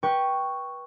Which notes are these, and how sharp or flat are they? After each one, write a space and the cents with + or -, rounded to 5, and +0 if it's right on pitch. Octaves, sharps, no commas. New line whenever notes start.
B4 -25 G5 +0 C#6 +0